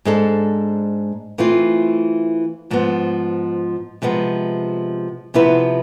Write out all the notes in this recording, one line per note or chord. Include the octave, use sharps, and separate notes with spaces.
G#2 G#3 D4 A4
E3 A3 C4 F4
G#2 F3 B3
C3 F3 G#3 B3
C3 F3 B3 E4 B4